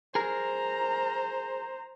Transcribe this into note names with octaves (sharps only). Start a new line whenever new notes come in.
G#4 A#4 C5 A#5